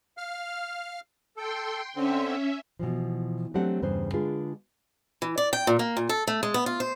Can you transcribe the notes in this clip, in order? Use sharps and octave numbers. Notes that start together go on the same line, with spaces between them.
F5 F6
A4 G5 C6
D3 C4 C#4 E5
B2 E3 F3
F#3 A3 C4 D4 G4 F#5
E2 G2 C#3 B3 C5
D3 G#3 D4 F4 G#4 B4
E3
D5
G5
A#2
A#3
A#2
A4
A3
G#3
B3
F4
C5